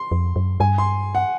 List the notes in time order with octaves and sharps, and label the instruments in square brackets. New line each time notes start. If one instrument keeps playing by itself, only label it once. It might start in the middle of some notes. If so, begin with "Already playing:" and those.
Already playing: [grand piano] C6
[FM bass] F2
F#2
[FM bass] G2 [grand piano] G#5
[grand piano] C6
F#5